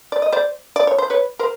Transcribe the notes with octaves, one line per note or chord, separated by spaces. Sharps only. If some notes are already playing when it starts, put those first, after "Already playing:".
D5
D#5
C5 D5
D5
C#5
C5
B4 C#5
A#4 C5